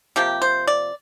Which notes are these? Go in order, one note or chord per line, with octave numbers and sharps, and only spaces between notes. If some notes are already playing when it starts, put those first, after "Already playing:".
C3 F3 A#3 G4
C5
D5